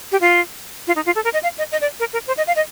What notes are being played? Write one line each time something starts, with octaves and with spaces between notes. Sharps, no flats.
G4
F4
F4
D#4
F4
A4
A#4
D#5
F5
D#5
D#5
D5
A#4
A#4
C5
D#5
F5
D#5